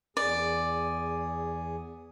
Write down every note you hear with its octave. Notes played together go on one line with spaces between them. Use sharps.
E2 G#4 D5